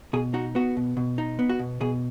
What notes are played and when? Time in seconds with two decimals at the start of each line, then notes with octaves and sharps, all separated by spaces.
0.13 B2 G#4
0.34 D#4 F#4
0.55 B3 F#4
0.77 B2
0.97 B2
1.18 D#4
1.39 B3
1.49 F#4
1.59 B2
1.81 B2 G#4